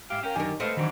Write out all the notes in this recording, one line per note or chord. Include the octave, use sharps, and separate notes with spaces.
G#2 G4 E5 F5
C#4 A#4 F5 G5
F#2 D3 D#3 F#3 D4 G4 A#4 G#5
G#3 A3 C4 A4 B4 D#5 F5
G#2 D#3 E3 F#3 D4